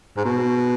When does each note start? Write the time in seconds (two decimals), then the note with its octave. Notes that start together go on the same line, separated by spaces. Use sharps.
0.17 G#2
0.25 B2